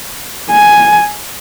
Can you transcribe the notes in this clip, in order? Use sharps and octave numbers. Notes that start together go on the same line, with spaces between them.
G#5